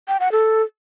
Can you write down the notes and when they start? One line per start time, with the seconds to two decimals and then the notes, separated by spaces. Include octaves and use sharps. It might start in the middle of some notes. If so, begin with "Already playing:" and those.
0.08 G5
0.20 F#5
0.32 A4